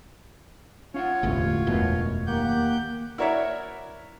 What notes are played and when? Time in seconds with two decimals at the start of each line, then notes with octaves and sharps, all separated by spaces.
0.94 C#4 F4 C#5 F5 F#5
1.23 E1 A1 D2 A3
1.67 E1 F#2 B2
2.27 D#2 A#3 G4 F#5 G6
3.18 E4 F#4 A#4 C#5 D5 E5